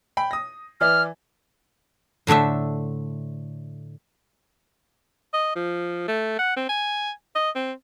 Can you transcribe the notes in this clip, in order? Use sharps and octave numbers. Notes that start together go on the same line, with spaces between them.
G5 B5
D#6 A#6
E3 D5 E5 F6
A2 D3 A3 D4 E5
D#5
F3
A3
F#5
C4
G#5
D#5
C4